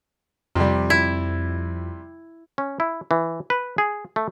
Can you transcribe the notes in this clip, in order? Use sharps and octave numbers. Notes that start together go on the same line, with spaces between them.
F2 C3 G3
E4
C#4
E4
E3
B4
G#4
A3